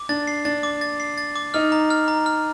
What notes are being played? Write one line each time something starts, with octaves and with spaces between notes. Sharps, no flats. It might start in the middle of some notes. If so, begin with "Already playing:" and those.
Already playing: D6
D4 A6
C7
D4 A6
D6
A6
C7
A6
D6
D#4 F6
A#5
F6
A#5
F6